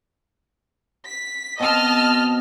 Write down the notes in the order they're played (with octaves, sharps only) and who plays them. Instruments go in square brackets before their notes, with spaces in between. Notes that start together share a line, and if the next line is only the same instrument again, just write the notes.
[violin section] B6
[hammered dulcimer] B2 C4 [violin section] D#5 A5 F6